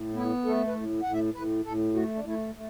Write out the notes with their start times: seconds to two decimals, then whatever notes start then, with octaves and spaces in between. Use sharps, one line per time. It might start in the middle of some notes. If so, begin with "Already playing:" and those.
Already playing: A2
0.14 B3 E4
0.45 A3 A4
0.67 B4
0.75 A2
1.03 A2 F#5
1.13 E5
1.34 A2 B4
1.64 A2 A4
1.95 A3 F#4
2.15 D4
2.24 A3 E4
2.55 A3